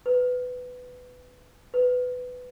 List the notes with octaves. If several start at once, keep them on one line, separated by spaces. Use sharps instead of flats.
B4
B4